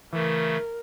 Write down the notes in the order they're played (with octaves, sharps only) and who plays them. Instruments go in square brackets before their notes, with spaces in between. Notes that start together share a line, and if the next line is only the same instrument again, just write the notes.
[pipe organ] C#3 A3 [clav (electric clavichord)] E3 [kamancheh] A#4